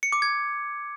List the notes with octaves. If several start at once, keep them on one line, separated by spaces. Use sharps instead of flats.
C#7
D6
G#6